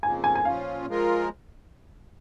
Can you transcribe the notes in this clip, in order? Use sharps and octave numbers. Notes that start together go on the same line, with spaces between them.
F2 C#3 F3 A#3 G#5
G#5
G#5
A#2 F3 C#4 F4 F5
F3 G#3 F4 A#4